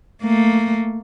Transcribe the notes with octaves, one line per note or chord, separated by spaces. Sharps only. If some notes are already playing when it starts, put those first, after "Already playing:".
A3 A#3